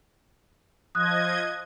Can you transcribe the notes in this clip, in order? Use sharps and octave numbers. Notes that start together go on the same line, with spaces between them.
F3 D#5 D#6 F#6 G#6